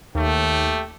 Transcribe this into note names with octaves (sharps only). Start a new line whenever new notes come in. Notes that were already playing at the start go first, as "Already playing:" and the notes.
D#2 A3 G4 G5